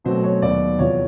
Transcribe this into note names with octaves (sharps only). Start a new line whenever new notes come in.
B2 F#3 A3 C4 C5
C#5
D#2 D#3 F#3 B3 D5
E2 C3 F3 C#5